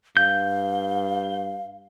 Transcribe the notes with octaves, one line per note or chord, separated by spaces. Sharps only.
G2 F5 G6